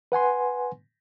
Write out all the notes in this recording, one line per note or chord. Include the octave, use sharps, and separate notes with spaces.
B4 F#5 G#5 C6